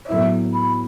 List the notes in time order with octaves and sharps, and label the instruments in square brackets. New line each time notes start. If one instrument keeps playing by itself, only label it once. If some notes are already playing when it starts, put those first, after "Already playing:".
[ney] C#5
[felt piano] A2 F#3 B3 E4 [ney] E5
[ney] B5